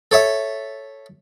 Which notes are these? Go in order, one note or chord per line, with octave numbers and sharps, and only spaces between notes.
A4 C#5 E5